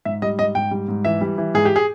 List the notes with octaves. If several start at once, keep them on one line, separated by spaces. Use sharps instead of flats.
G#2 E5
G3 D#5
G#2 D#5
G#2 G5
G3
G#2
E3 E5
G3
E3
G#2 G#4
G4
G#4